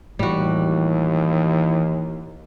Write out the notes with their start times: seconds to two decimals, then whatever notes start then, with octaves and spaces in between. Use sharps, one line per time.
0.19 D#2 A2 E3 G3 F#4